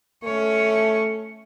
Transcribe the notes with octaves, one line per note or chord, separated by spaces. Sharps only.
A3 C#4 C#5